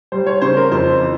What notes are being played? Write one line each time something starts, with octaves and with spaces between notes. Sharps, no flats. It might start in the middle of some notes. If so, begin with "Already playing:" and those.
G3 C5
C#5
C#3 C5
A#4
F2 C5
E3